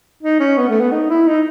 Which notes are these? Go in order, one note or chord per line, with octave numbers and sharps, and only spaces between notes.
D#4
C#4
B3
A3
B3
D#4
E4
D#4